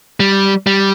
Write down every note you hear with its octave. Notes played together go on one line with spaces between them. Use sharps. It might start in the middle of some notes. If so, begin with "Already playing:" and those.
G3
G3